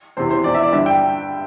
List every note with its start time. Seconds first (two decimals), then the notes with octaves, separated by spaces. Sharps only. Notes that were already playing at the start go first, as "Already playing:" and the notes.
0.17 E2 C3 E3 C5
0.31 C5
0.44 E2 E3 D5
0.54 E5
0.63 D5
0.73 G2 D3 E5
0.86 G5